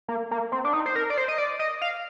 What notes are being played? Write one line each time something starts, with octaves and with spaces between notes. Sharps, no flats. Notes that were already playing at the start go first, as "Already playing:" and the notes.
A#3
A#3
C4
D4
D#4
C5
A#4
D5
C5
D#5
D5
D#5
F5